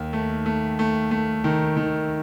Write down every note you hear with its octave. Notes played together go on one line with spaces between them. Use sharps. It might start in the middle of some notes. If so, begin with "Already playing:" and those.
Already playing: D#2 D#3
A3
A3
A3
A3
D#3
D#3